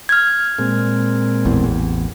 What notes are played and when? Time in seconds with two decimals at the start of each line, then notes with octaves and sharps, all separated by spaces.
0.09 F6 G#6
0.59 A#2 G#3 C4
1.45 A1 E2